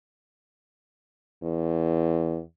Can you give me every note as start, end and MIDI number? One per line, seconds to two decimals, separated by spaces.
1.43 2.40 40